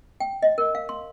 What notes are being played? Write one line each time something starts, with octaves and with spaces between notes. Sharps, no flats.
G5
D#5
A#4
F5
C6